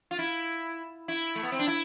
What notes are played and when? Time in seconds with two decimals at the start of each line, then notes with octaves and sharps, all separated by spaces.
0.11 F4
0.19 E4
1.08 E4
1.35 A3
1.43 B3
1.52 C4
1.59 D4
1.68 E4